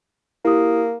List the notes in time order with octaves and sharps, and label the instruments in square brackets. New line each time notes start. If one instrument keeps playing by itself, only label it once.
[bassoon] A#3 [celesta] E4 G4 D#6